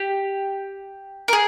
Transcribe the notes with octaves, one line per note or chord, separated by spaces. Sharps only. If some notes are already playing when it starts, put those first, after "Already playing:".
Already playing: G4
A#4
G#4